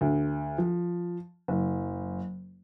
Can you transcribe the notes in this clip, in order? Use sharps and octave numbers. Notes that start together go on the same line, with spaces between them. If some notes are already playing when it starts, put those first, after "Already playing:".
D2
F3
F#1